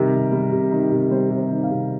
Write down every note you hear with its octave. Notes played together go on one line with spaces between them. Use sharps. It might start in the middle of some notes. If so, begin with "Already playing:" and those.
Already playing: C3 D#3 G3 A#4
C3
G3
C3
D#3
C3
G3 C5
C3
C5
D#3
F5
C3